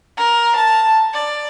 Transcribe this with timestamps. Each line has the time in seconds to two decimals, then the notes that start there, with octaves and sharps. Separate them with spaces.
0.18 A#4
0.57 A5
1.13 D5